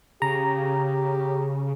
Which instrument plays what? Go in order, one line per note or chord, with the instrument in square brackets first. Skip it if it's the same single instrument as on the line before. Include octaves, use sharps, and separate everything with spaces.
[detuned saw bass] C#3 [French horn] G4 [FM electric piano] A#5